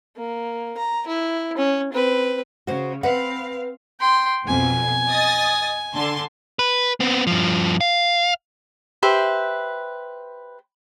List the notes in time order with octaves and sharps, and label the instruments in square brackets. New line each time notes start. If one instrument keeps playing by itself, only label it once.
[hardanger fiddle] A#3
A#5
E4
C#4
C4 B4
[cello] C#3 [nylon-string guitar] F#4 C5
[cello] C4 F5 [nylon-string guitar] B4 F#5
[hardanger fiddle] G5 C6
[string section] B1 F2 B2 [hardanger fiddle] G#5
[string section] D#5 D#6 A6
D3 A5 C6
[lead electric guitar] B4
B3 C4
G2 F3
F5
[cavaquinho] G4 B4 C5 E5